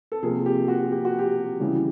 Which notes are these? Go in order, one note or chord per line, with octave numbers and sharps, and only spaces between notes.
A4
C3 F3 A#3 G#4
G4
F#4
G4
F#4
G4
C#3 E3 G3